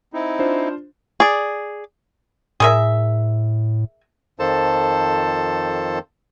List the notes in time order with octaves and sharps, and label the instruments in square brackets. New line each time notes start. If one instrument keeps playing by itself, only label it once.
[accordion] C4 D#4 E4
[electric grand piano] D4 F4 C5
[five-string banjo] G#4 D5
[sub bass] A2 [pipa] G#4 A#4 E5
[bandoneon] F2 D#3 F3 A4 C5 A5